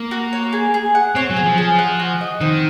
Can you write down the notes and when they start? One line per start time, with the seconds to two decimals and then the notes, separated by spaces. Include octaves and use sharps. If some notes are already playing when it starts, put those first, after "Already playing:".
Already playing: A#3
0.11 F#4
0.33 C#5
0.53 G#4
0.74 G#4
0.95 F#5
1.15 C4 C#5
1.30 F#3
1.36 G#4
1.44 F3
1.58 G#4
1.79 F#5
2.00 F#4
2.21 D#5
2.41 D#3 C4